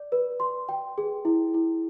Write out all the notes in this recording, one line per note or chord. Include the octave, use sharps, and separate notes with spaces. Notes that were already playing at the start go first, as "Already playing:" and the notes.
Already playing: D5
B4
C6
G5
G#4
E4
E4